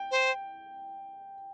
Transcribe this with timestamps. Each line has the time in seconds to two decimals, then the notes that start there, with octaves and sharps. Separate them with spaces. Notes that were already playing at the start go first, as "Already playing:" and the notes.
Already playing: G5
0.11 C5